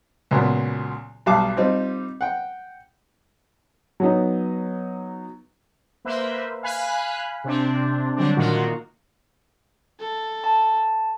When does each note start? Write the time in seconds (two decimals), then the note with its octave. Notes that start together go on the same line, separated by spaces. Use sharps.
0.31 C#2 A#2 F#3 B3
1.26 B1 G3 F5 A5 D6
1.57 G3 C4 D#4 F4 G4
2.21 F#5 G5
4.00 F#3 B3 D#4
6.05 A#3 B4 C5 E5
6.63 F5 G#5 B5 F#6
7.44 C3 C4 D4
8.16 D3 F#3 G3 C4 D4
8.37 A#2 D#3 A#3 F4 F#4
10.00 A4
10.44 A5